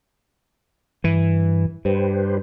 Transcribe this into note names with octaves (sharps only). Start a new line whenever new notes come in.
G2 E3
G2 G4 B4 C5